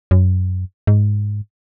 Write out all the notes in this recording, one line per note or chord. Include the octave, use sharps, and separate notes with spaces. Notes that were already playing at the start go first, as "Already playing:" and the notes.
F#2
G#2